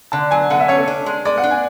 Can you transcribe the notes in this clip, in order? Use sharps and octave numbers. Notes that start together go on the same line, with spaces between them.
D3 A5
F#3 G#5
D3 F#5
E5
C#4 C#5
A4
D4
G#3
G#3 D5
F#5
D4
G#5